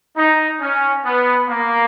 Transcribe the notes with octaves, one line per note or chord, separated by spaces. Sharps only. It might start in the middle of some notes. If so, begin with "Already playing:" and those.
D#4
C#4
B3
A#3